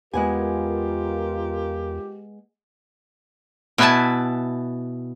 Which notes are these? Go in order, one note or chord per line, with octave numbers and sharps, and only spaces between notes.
E2 G#3 B3 F4 G4 A#4 G#5
B2 E4 B4 E5 G#5 A5